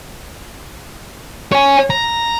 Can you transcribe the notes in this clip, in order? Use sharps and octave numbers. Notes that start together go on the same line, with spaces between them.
C#5 G#5
A#5